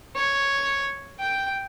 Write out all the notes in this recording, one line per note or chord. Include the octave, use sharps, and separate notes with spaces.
C#5
G5